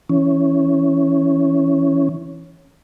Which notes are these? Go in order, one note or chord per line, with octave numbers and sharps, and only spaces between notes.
E3 C#4